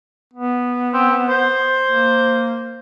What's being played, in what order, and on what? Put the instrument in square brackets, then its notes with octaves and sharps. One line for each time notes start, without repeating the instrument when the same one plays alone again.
[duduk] B3
[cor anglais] C4
C5
[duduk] A#3